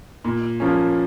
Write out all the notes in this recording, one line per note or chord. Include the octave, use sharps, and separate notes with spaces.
A#2
F3 A#3 C#4